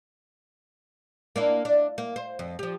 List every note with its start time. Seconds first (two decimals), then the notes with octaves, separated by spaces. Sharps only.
1.36 A#3 D4 E4
1.65 D4
1.98 A#3
2.16 C5
2.39 F2
2.59 F3 G4